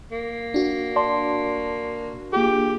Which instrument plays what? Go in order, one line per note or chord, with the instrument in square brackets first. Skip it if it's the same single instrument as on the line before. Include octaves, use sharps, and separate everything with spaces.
[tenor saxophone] A#3
[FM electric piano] D4 F#4
[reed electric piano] D5 A5 C6
[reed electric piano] A#3 F4 G#4 [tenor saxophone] G4